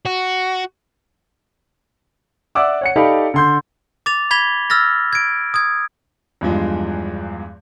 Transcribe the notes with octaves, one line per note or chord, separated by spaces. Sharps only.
F#4
D5 E5 F#5 D6 E6
C#5 F#5 C#7
D#4 G4 A4 D5 F5 B5
D3 C6 G6
D6 A6 F7
B5 G#6 B6 F7 G7
E6 F6 A6 A#6
G#6 D7
D#6 G#6
E2 G2 F3 G#3